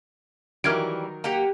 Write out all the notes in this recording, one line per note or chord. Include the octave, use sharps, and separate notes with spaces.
D#3 E3 F#3 G3 A#4 F6 G#6 D7
A#3 G4 F#5 A#5